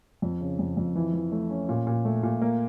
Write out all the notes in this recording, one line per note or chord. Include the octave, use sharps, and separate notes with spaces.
F2
C#3
F2
F2
E3
E3
A3
C#4
A#2
A#2
A3
A#2
A#3